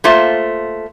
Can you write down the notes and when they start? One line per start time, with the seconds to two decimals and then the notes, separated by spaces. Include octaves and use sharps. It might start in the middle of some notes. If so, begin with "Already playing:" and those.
0.04 A3 A#3 F4 C5